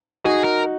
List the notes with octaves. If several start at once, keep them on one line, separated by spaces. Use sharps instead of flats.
D#4 F#4 G#4
A#4